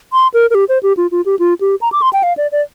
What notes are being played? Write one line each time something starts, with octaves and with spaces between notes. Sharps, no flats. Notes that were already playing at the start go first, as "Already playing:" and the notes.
C6
A#4
A#4
G4
C5
G4
F4
F4
G4
F4
G4
A#5
D6
C6
G5
F5
D5
D5